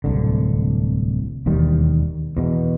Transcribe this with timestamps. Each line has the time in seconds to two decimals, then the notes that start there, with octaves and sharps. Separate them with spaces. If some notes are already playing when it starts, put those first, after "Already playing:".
0.04 D1 C2 D3
1.46 E1 D#2 D#3 G3
2.37 E2 B2